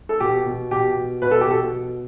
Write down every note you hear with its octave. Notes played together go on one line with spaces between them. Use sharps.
A4
B2 G4
B2
B2 G4
B2
B2 B4
A4
G4
B2 A4
B2